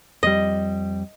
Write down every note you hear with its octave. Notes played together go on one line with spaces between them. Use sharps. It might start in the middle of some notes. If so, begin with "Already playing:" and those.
F2 G3 D#5